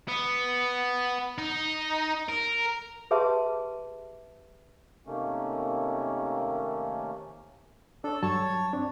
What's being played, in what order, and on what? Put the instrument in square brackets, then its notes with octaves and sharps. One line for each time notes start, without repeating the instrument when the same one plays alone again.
[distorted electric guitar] B3
D#4
A#4
[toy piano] G4 G#4 B4 E5 A5 C6
[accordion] C3 D#3 A3 A#3 C#4
[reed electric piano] D4 C#5 [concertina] A4
[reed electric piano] G2 F#3 [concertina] C#5 [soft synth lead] A5
[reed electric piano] C4 D4